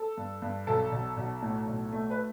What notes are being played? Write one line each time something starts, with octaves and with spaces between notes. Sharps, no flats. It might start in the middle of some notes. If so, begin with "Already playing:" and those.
Already playing: A4
G2
G2
B1 A4
B1
B1
A2
B1
A3
B4